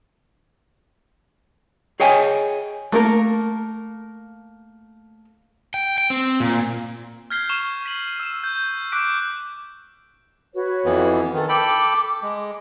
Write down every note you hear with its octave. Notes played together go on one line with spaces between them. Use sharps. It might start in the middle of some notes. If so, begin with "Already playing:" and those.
G#4 C#5 D#5 G5 G#5
A3 A#3 A#4
G5
G5
C4
A#2
F6 G6 G#6 B6 C7 G7
C#6 E7 F7 G7
B6 D#7 F#7
E6 E7
G6
D6 F#6 B6 D7
F#4 B4 C#5
F2 E3 B3
D#3 A4
A4 G5 B5 D6
G#3